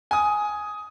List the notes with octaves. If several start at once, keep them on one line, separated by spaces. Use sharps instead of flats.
G#5 D#6